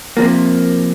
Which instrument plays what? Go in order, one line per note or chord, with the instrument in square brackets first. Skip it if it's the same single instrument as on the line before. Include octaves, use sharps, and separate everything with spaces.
[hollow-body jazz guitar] C3 F3 A#3